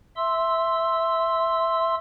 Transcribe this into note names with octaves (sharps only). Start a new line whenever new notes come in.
E5 C6 E6